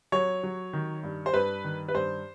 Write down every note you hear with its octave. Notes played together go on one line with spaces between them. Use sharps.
F#3 C#5
F#3
D#3
G2
C5
G2 B4
D#3
B4
G2 C5